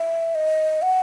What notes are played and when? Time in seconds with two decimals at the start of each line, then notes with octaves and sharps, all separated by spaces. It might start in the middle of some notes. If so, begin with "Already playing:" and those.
Already playing: E5
0.35 D#5
0.82 F#5